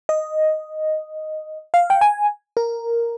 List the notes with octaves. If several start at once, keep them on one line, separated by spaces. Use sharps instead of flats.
D#5
F5
G5
G#5
A#4